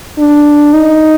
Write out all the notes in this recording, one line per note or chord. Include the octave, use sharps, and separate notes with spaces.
D4
D#4